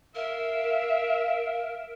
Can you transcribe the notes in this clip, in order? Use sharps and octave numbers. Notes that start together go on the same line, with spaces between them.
A#4 E5 F5